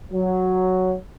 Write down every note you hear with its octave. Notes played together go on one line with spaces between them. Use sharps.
F#3